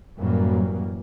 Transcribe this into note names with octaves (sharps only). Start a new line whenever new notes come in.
F#2 A2 E3 F#3 G3 A#3